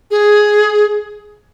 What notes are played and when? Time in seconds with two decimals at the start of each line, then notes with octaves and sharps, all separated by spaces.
0.11 G#4